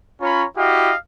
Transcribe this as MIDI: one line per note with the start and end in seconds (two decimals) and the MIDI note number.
0.21 0.45 61
0.21 0.45 65
0.21 0.45 73
0.21 0.45 82
0.21 0.45 83
0.57 0.94 64
0.57 0.94 66
0.57 0.94 67
0.57 0.94 75
0.57 0.94 77